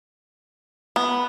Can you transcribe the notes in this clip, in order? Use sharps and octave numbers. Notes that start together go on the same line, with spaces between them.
B3